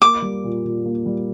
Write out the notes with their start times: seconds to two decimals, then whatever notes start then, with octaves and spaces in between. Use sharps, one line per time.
0.02 A#3 D6
0.22 G3
0.44 A#2
0.65 A#2
0.86 A#3
1.06 G3